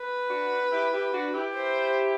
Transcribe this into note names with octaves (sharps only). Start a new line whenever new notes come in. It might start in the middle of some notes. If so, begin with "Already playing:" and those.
Already playing: B4
D4 F#4
E4 G4
E4 G4
D4 F#4
E4 G4
C5